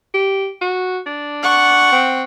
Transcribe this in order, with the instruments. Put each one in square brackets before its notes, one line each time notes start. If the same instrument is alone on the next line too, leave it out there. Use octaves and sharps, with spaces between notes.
[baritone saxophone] G4
F#4
D4
[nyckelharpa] F#5 C#6
[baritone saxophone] C4